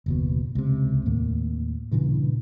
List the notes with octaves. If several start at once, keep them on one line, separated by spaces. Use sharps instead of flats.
F#1 D#2 B2
C#2 C3
D#2 A2 A#3
G2 A#2 C#3 E3